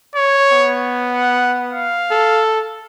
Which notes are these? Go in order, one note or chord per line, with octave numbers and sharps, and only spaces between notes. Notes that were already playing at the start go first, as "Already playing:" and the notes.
C#5
B3
F#5
F5
A4